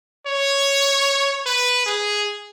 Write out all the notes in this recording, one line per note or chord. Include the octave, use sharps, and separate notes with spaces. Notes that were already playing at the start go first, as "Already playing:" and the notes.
C#5
B4
G#4